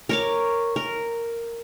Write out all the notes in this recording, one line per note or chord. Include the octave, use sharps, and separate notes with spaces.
A#4 C#5 D6
A#4